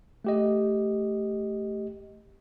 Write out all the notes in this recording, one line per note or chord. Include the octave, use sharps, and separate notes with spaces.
A3 G4 D#5